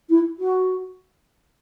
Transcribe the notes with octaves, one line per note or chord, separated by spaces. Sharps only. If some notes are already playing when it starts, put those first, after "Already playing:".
E4
F#4